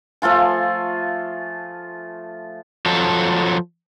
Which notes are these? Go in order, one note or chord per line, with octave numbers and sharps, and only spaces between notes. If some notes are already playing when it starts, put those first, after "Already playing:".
F3 A3 F4 G#5
F3 F#3 A4